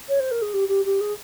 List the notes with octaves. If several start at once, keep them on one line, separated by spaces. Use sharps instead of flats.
C#5
C5
A#4
G#4
G4
G4
G4
G#4